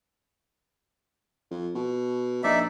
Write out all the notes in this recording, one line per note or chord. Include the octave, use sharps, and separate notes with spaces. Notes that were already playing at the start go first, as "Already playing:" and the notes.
F2
B2
A#1 D#4 D5 E5